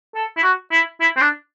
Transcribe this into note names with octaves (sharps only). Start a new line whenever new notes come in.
A4
E4
F#4
E4
E4
C4
D4